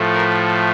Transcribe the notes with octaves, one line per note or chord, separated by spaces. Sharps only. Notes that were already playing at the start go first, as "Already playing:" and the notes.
Already playing: A2 F3 A3
A#4